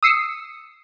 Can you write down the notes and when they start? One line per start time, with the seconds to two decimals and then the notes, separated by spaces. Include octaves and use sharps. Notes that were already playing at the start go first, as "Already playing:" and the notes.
0.03 D#6 E6 C7 C#7